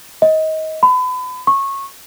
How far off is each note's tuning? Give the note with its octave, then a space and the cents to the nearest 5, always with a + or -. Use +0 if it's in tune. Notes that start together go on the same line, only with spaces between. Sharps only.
D#5 +20
B5 +35
C#6 -20